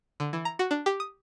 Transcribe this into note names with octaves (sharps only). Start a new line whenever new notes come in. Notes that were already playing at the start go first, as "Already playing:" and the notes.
D3
E3
A#5
F#4
D4
G4
D#6